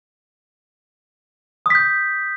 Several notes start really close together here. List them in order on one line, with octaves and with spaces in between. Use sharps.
D#6 B6 G6